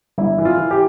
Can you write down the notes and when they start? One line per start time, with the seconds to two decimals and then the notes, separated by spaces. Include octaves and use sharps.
0.18 G1 E4
0.38 E3
0.45 F4
0.57 E3
0.71 G4